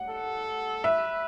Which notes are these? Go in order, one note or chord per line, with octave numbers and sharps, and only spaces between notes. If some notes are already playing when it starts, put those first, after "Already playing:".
Already playing: F#5
A4
B4 E5